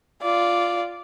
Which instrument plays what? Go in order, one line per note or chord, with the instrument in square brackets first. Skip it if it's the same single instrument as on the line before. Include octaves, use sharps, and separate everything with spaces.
[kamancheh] F4 D5